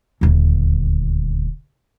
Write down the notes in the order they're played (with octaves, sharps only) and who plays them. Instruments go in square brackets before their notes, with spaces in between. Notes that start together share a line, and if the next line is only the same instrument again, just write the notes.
[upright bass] D#1 D2